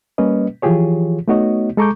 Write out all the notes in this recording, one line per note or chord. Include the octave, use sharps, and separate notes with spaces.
G3 A#3 C#4 B4 D#5
E3 F3 F4 G4 G#4 C#5
A3 B3 D#4 F#4 C#5 D#5
G#3 A4 A#5 C#6 D6 G6